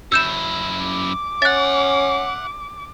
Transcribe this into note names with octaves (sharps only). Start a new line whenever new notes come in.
F#2 E4 E6 G6 E7
D6
C#4 E5 F#5 F#6 A6